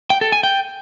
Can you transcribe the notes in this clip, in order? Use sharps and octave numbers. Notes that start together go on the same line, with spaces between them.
G5
A4
G#5
G5